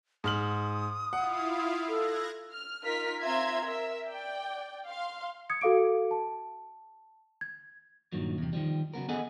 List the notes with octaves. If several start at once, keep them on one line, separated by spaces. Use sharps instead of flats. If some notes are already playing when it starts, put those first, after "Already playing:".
G#2 D#6 F6 F#7
E4 F4 F5 F#5
A4 F#6 G#6 A#6
F6
D#4 F4 A#4 F6 B6
C4 F4 E5 A#5 C6 G#6
A#4 E5
D5 G5
F5 C6
D#6 G#6 C#7
F#4 A4 F5 D6 D7
A5
G#6
G2 A#2 D#3 F#3
E2 C3
D#3 F3 G3
C#3 F#3 B3 A#4
B3 G#4 A4 D#5 F#5 G#5